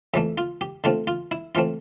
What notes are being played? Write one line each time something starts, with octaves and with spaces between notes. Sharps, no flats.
F2 E3 A3 E5
F4
G4
D3 A3 C4 F4
F4
E4
E3 A3 C4 F4